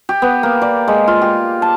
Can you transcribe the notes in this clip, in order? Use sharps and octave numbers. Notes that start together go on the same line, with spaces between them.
G4
B3
A#3
D5
G#3
F4
G4
A5